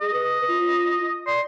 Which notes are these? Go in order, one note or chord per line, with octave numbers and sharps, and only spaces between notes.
G#4 D#5
B4
F4
D5 C6